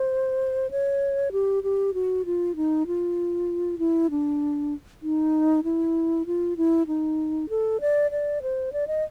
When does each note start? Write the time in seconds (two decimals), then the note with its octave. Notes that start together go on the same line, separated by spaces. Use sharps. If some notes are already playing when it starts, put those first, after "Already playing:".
Already playing: C5
0.71 C#5
1.32 G4
1.63 G4
1.94 F#4
2.25 F4
2.56 D#4
2.87 F4
3.79 E4
4.10 D4
5.02 D#4
5.64 E4
6.26 F4
6.57 E4
6.87 D#4
7.49 A4
7.81 D5
8.11 D5
8.42 C5
8.73 D5
8.87 D#5